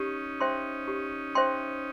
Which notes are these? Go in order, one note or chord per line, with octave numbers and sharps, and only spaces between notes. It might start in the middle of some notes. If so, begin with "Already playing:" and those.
Already playing: C#4 D#4 G4
C5 E5 G5 C6
G4
C5 E5 G5 C6